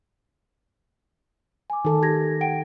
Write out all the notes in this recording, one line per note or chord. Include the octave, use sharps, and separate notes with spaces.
G#5 D6
D#3 A4
G4 G#6 A#6
F#5 G5 D7